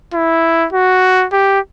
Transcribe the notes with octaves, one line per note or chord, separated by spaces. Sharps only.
E4
F#4
G4